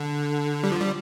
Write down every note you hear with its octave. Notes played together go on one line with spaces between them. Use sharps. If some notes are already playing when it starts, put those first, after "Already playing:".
Already playing: D3
G3
F3
G3